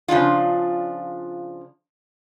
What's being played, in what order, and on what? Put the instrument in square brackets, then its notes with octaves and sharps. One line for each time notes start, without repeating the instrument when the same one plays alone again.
[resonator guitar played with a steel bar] C#3 F3 D4 F4